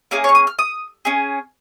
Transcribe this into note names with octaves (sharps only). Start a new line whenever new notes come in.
A#3 C#4 G#4 F5
C#5
C#6
D#6
F6
D#6
C#4 G#4